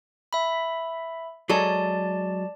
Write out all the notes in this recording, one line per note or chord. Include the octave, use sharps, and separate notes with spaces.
E5 B5
F#3 G#3 A4 D5 A5